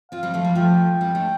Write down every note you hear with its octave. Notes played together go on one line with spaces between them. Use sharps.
C4 F4 F5
G3 C4
F3 A3
G3
F3 A3 G5
G3 C4
A3 D4